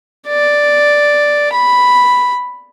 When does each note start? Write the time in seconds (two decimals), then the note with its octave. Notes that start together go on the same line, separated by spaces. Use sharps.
0.28 D5
1.53 B5